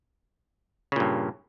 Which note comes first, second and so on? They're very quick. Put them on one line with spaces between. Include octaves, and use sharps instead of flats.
C#3 A#2 G2